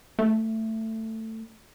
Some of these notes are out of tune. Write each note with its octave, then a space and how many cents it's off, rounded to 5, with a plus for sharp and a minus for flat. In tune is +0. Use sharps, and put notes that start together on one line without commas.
A3 +15